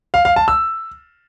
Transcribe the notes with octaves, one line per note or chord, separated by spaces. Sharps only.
F5
F5
A5
E6